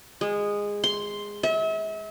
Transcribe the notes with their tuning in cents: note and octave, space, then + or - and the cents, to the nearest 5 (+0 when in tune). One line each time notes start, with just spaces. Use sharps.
G#3 -15
C6 +0
E5 -40